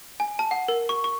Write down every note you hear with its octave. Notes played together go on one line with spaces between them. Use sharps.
G#5
A5
F#5
A#4
C#6
C#6